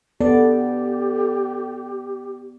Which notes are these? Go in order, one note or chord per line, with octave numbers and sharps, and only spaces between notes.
B3 G4 A4 D5